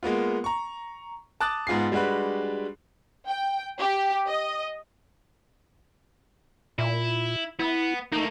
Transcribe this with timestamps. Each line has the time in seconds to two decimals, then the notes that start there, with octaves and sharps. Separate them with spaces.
0.03 G#3 A#3 B3 F4
0.44 A#5 C#6
1.41 A5 D6 D#6 F#6 A6
1.67 G#2 B3 F4 G#4 C7
1.92 G3 G#3 D4 F#4 B4
3.28 G5
3.80 G4
4.27 D#5
6.79 A#2 E4
7.59 B3 E4
8.12 A3 A#3 D#4